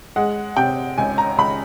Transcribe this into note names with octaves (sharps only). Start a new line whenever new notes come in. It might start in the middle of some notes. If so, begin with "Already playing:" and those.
G#3 F#5
C3 G5
C#2 G#5
A#5
C#2 B5